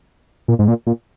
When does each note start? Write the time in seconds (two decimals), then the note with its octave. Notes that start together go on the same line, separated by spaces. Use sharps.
0.48 A#2
0.59 G#2
0.68 A#2
0.87 A#2